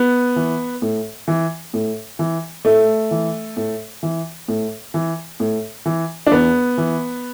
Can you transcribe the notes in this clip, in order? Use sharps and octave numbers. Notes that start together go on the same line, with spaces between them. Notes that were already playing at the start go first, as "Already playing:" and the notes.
Already playing: B3
E3
A2
E3
A2
E3
A2 A3
E3
A2
E3
A2
E3
A2
E3
D4
E2 B3
E3